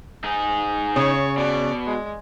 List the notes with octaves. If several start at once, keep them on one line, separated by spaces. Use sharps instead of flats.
D#4 G#4
C#3 C#5
B2 D5
G#3